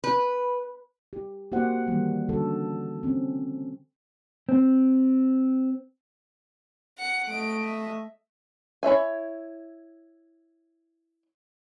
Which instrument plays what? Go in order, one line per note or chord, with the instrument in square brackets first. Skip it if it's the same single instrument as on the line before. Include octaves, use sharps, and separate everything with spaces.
[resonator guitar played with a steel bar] B4
[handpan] G4
A#3 F#4 G4 C5 F#5
D#3 E3 G3 A#3
D3 G3 C#4 F#4 A4
C4 C#4
[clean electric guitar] C4
[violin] F#5 C#7
[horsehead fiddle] A3 D#5 [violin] D7
[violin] E5
[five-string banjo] E4 C#5 E5 G#5